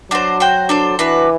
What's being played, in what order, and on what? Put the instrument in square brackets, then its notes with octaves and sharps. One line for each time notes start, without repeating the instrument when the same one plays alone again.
[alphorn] F#3 [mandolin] D4 F#4 C5
[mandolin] F#4 C5 G5
D4 A4 C5
[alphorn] E3 [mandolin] D4 F#4 B4